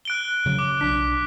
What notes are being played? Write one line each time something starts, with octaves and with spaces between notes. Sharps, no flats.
F#6 D7 G7
C#3 F#3
D6
B1 D4 B6